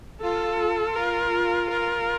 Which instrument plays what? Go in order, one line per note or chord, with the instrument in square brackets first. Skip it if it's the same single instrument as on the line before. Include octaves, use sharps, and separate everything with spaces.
[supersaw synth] F4 [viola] A4
[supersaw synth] F4 [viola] A#4
[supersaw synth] F4 [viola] A#4